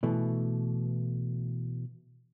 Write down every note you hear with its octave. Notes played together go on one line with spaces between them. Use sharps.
B2 E3 A3